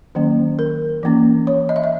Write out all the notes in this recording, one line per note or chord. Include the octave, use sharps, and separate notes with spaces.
D#3 F#3 A#3 C#4
A#4
E3 A#3 C#4
C#5
D#5
E5
D#5